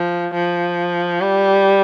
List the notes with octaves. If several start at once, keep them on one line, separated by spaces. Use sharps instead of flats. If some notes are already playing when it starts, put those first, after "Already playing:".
Already playing: F3
F3
G3